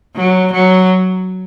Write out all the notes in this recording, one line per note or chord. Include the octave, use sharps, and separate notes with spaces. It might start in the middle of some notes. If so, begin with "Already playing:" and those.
F#3
F#3